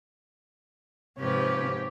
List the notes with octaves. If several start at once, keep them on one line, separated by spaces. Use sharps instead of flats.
G#2 C3 F3 G4 B4 C#5